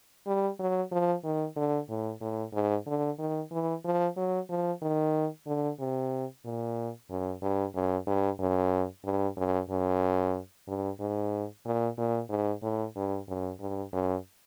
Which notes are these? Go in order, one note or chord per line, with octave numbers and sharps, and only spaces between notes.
G3
F#3
F3
D#3
D3
A2
A2
G#2
D3
D#3
E3
F3
F#3
F3
D#3
D3
C3
A#2
F#2
G2
F#2
G2
F#2
G2
F#2
F#2
G2
G#2
A#2
A#2
G#2
A2
G2
F#2
G2
F#2